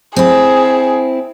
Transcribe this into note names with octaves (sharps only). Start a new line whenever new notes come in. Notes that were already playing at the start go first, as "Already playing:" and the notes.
C4 E4 G#4